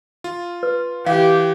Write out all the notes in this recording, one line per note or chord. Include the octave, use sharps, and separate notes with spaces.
F4
B4
E3 G4 F5